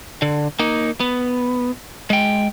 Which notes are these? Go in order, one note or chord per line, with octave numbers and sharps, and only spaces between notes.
D3
A#3 D#4
B3
G#3 G5